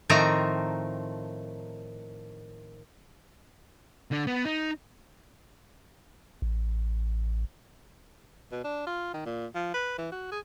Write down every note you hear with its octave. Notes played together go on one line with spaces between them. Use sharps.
A2 D#3 F3 A3 C4 A#5
D3 D4
B3
D#4
A1
B2
D4
F4
D#3
A#2
F3
B4
E3
F#4
G#4